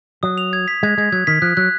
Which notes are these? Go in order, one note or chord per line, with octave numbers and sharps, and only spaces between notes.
F#3 D#6
F7
G#6
B6
G#3 G#6
G#3 G#6
F#3 G#6
D#3 B6
F3 F#6
F#3 F#6